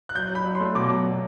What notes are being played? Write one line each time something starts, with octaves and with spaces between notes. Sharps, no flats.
F#6
F#3 G6
F#3 B5
F#3
C6
A3
B2 D6
F#3
B2